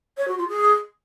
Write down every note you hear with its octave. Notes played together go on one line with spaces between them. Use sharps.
C#5
F#4
F4
G#4